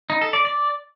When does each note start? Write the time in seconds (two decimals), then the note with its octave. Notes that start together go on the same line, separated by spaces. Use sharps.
0.10 D#4
0.21 A4
0.33 D5
0.45 D5